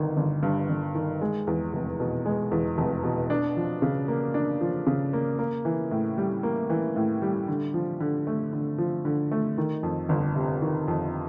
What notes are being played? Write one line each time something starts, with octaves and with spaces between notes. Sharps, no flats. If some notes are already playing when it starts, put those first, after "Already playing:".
Already playing: G1 D#3
G1
G2
G1
D#3
G#3
E2
F1
B2
G#3
E2
F1
B2
D4
F3
C#3
A#3
D4
F3
C#3
A#3
A#3
E3
A2
G3
A#3
E3
A2
G3
D3
F3
D3
A3
D3
F3
D3
A3
D#3
F2
G1
C3
D#3
F2